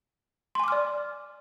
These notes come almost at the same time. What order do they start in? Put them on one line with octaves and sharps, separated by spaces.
C6 G#5 D6 F6 D5